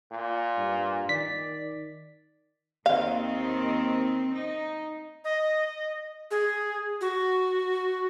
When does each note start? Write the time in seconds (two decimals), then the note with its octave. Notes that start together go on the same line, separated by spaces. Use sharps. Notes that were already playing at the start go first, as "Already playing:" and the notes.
0.12 A#2
0.58 G2
1.09 D#3 D5 B6
2.86 D#2 D#3 C4 F5
4.35 D#4
5.25 D#5
6.31 G#4
7.01 F#4